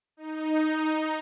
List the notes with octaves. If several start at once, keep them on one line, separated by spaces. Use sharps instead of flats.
D#4